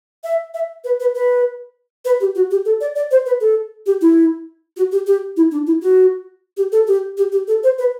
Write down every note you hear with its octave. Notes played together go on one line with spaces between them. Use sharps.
E5
E5
B4
B4
B4
B4
G4
F#4
G4
A4
D5
D5
C5
B4
A4
G4
E4
F#4
G4
G4
E4
D4
E4
F#4
G4
A4
G4
G4
G4
A4
C5
B4